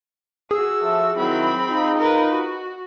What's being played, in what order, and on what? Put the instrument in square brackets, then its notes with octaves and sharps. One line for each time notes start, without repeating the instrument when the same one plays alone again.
[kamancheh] F#4 E6 [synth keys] G#4
[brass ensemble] F3 A4 E5
[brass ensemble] D#3 F#3 E4 [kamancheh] C4 B5
[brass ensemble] D#4 F4
[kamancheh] A#4 B4
F#4